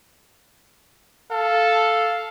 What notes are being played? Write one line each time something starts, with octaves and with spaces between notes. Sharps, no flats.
A4 F5